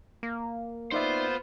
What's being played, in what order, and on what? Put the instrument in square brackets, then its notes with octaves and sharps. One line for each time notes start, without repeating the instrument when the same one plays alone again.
[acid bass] A#3
[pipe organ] B3 F4 [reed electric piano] D#4 D5 E5 [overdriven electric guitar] C5